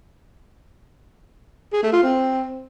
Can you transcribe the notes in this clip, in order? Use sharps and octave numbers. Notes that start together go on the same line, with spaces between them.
G#4
A3
F4
C4